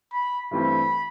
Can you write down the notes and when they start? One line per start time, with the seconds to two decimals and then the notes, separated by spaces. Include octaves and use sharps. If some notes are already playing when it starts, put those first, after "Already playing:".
0.13 B5
0.51 G2 E3 A3 C4 B5